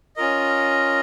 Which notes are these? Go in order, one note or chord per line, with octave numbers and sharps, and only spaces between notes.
C#4 F4 A#4 D#5